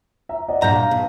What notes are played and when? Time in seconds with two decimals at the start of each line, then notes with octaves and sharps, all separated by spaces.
0.29 E5 A#5
0.48 D5 D#5 F#5
0.62 G2 A#2 F#5 A#5 G6
0.76 F5
0.91 B1